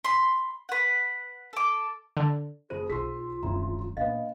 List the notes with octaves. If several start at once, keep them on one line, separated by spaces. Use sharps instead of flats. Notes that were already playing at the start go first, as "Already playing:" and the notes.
B5 C6
B4 F#5
A4 D6
D3
F#1 F4 G#4 C5 D#7
B1 F4 G#4 C6 E6 B6
D1 G#1 F#2 C#3 E4 A#5
A#2 B3 D4 D#5 F5